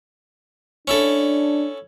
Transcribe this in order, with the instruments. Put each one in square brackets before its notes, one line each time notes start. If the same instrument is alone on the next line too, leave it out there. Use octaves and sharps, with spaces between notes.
[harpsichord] C#4 E4 A4 [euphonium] D4